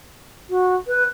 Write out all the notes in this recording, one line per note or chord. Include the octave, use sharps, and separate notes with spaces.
F#4
B4